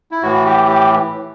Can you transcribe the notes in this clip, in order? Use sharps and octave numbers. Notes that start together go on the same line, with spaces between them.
E4
A2 E3 F#4
G4
G4